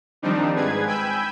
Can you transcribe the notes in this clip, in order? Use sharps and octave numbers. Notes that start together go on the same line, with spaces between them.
D#3 F3 G3 C4 D4 D#4
G#2 G#4 B4 G#6
G5 G#5 B5 E6 G6